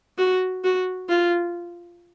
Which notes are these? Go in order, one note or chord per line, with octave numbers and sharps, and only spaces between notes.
F#4
F#4
F4